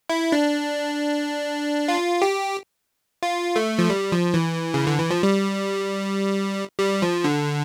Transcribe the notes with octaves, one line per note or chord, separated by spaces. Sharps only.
E4
D4
F4
G4
F4
A3
F3
G3
F3
E3
C#3
D3
E3
F3
G3
G3
F3
D3